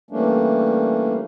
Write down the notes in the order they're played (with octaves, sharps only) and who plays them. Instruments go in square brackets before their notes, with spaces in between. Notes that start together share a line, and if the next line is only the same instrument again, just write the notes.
[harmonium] E3 G3 A3 A#3 C#4 D4